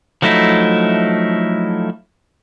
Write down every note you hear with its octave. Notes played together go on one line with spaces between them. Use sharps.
F3 F#3 A3 D#4 E4